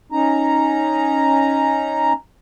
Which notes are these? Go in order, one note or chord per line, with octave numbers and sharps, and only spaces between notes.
C#4 D#4 A#5